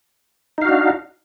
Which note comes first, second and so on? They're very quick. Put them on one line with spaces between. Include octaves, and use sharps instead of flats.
D#4 F5 F#4 D4